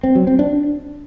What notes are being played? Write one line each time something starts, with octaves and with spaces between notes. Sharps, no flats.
C4
F#3
C4
D4